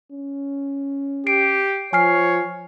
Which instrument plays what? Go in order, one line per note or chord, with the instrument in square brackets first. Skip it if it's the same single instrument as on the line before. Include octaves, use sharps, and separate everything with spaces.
[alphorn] C#4
[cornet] G4 [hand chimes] C7 D7
[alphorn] F3 [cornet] C#5 [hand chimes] G#5 F6 C7